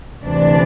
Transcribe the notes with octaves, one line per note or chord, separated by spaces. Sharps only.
D2 C3 E3 D4